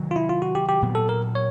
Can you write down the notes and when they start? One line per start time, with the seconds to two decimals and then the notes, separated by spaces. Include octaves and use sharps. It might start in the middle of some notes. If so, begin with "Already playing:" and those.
Already playing: C3 D#3 F#3
0.11 F4
0.16 E4
0.29 F4
0.42 F#4
0.55 G4
0.69 G4
0.82 A#2 F#3 B3
0.95 A4
1.09 A#4
1.35 C#5